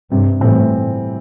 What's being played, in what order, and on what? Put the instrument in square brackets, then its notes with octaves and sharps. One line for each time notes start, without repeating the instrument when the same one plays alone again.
[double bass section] G2 [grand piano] C3
[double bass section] A2 [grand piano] E3 G3 C4